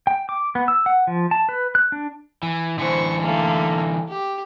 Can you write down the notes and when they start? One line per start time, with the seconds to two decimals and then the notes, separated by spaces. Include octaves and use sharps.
0.07 G5
0.29 D6
0.55 B3
0.68 E6
0.86 F#5
1.07 F3
1.31 A5
1.49 B4
1.75 F#6
1.92 D4
2.43 E3
2.78 D3 E3 C5 C#6
3.21 A3 A#3
4.08 G4